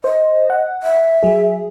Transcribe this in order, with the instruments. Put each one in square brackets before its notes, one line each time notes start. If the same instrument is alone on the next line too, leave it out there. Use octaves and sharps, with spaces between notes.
[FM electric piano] C5 [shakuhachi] D#5
[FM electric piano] F#5
[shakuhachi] E5
[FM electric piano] F#3 G#4